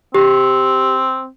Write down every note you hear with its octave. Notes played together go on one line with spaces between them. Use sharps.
C4 G4